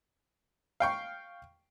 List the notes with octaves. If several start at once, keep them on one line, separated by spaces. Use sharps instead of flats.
F5 G5 C#6